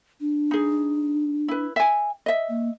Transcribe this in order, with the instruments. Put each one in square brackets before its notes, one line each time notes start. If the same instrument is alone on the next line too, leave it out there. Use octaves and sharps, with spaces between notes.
[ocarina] D4
[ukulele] D#4 G#4
E4 B4
E5 G#5
D#5 E5
[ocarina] A#3